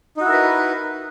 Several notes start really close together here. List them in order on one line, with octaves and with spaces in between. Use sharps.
D#4 F#4 E4 A#4 B4